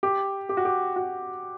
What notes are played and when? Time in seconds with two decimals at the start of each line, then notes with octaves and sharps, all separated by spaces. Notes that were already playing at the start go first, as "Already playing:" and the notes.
0.03 G4
0.49 G4
0.57 F#4
0.65 G4
0.96 F#4